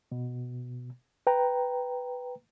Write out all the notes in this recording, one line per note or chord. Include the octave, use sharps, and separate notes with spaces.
B2
B4 G5 A#5